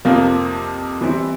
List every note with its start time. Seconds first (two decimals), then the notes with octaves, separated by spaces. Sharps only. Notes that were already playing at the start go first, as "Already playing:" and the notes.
0.05 F2 C3 F3 A#3
1.01 E3 G3 C4 E4